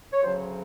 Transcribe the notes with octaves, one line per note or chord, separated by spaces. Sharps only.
C#5
D2 C#3 F#3 C5